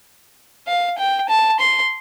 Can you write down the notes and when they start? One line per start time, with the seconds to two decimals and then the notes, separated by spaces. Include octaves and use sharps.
0.67 F5
0.98 G5
1.29 A5
1.60 C6